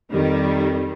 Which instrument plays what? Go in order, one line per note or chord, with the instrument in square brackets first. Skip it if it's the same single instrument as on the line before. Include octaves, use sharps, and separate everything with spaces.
[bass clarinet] F2 [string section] D#3 G3